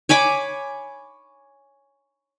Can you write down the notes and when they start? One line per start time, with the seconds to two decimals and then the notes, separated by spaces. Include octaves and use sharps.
0.09 C#5 G#5 B5 D6